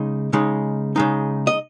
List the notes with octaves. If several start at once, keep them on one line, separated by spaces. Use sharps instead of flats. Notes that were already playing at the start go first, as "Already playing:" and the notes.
Already playing: C#3 G#3 D#4
C#3 G#3 D#4
C#3 G#3 D#4
D#5